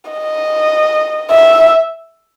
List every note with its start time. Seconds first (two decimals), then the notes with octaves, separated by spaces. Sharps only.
0.11 D#5
1.31 E5